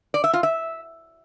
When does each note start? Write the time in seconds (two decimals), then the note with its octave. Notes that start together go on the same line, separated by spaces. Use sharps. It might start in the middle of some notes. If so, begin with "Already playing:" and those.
0.14 D5
0.24 E5
0.33 F4
0.43 E5